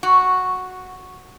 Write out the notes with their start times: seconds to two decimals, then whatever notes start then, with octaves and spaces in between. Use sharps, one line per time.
0.03 F#4